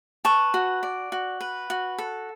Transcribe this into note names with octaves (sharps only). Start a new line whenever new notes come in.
B4 A5 C#6
F#4
D5
F#4
B4
F#4
A4